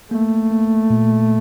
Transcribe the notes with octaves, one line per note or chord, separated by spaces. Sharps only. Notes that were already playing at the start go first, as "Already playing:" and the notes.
A3 A#3
A#3
A#2